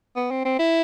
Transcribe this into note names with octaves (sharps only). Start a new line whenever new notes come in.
B3
C4
C4
E4